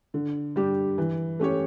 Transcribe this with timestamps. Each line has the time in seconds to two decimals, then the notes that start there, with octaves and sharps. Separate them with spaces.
0.14 D3
0.56 G3 D4 G4
0.98 E3
1.39 A3 C#4 G4 C#5